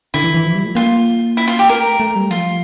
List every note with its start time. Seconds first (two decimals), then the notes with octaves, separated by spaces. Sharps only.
0.14 D3 E4
0.24 E3
0.35 E3
0.45 F3
0.55 G3
0.66 A3
0.75 A#3 F4
1.37 E4
1.48 F4
1.59 G4
1.69 A3 A#4
2.00 A3
2.16 G3
2.31 F3 F4